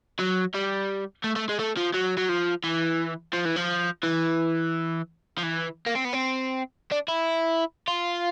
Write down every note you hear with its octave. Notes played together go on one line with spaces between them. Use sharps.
F#3
G3
A3
A3
G#3
A3
F3
F#3
F#3
F3
E3
F3
E3
F3
E3
F3
E3
A#3
C4
B3
C4
D4
E4
F4